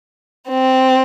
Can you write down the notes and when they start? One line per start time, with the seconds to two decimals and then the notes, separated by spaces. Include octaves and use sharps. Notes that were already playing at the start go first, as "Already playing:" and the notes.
0.49 C4